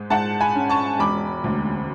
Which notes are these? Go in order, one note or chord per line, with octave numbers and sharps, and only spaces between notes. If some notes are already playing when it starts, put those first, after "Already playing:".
Already playing: G#2 G#3
G#2 F#5 A5
G#5 B5
C#4
A5 C#6
E1 B5 D6
D2